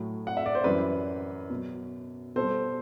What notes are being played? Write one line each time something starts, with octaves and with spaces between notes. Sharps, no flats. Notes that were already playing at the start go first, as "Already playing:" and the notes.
Already playing: A2 F#3
F#5
E5
D5
C5
F#2 E3 G3 B4
B2 F#3
B2 G3 A4 C5